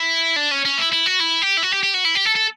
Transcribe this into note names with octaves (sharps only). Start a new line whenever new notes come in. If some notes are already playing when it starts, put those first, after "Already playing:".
Already playing: E4
D4
C#4
C#4
E4
E4
F#4
E4
G4
E4
F#4
G4
G4
F#4
E4
G4
A4
A4